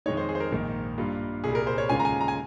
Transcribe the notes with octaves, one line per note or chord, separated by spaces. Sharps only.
F2 D#3 G#3 D#4 C#5
C5
G#4
C5
A#4
A#1 G#2 D#3 A#3
G2 G3 A#3 F4
C2 A#2 G3 G#4
A#4
C5
C#5
D#2 C#3 G#3 C#4 F4 G#5
A#5
G#5
A#5
G#5